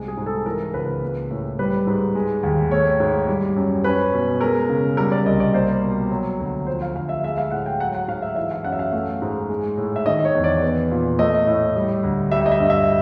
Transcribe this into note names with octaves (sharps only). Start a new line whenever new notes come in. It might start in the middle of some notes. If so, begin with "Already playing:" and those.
Already playing: C2 G#3
G#4
G#2
A4
E3 A#4
C#2 B4
A#3
A2
G3 B4
G#2
G#3
D#2
A3 C#5
G#2
G3
F#2
C#4 B4
B2
G#3 A#4
C#3
G3 A#4
D5
C2 D#5
D5
A#3 C5
B2
F#3
D2
F3 C5
F5
D2 F5
E5
G#3 E5
F5
A2 F#5
G5
F#3 F#5
F#5
G#2 F5
E5
E3 E5
F5
F#2 F#5
E5
F5
A3
G#2
G#3
A2
E5
D#3 D#5
C#5
E2
D5
B3
A#2
A3 D#5
A2
G3
D2
G3 E5
D#5
E5
G2
E5